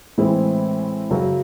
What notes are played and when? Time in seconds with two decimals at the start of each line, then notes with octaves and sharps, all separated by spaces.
0.18 A2 E3 G#3 C4 E4
1.11 F#2 C#3 F#3